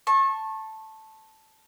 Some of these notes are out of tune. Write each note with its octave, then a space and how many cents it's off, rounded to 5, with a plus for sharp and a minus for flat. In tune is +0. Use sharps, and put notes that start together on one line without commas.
A5 +0 C#6 -30